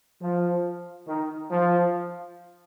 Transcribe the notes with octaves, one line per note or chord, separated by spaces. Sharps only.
F3
D#3
F3